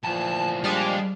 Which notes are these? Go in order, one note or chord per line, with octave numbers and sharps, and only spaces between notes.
D2 A#2 E3 F3 A5
D#2 G3 G#3 D4 G4 F5